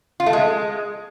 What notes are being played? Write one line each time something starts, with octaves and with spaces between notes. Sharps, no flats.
F4
A3
G#3